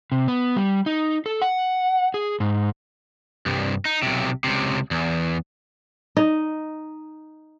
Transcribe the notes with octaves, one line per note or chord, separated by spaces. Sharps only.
C3
B3
G3
D#4
A4
F#5
G#4
G#2
C2 G2
D#4
B1 C3
C#2 C3
E2
D#4